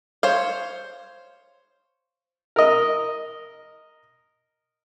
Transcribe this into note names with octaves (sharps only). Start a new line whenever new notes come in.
C5 C#5 F5
A#4 D#5